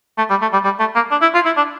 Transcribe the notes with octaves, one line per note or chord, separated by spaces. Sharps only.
A3
G3
A3
G3
G3
A3
A#3
D4
E4
F4
E4
D4